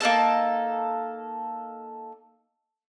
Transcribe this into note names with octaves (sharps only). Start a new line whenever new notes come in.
A#3 D#4 A4 A5